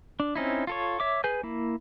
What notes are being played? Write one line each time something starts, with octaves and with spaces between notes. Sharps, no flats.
D4
C4 C#4 D#4 E4
F4 A4 C#5
C#5 E5 D6
G#4 B4 G#5 G6
A#3 E4